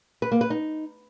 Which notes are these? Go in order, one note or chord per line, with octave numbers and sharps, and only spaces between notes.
B4
A#3
B4
D#4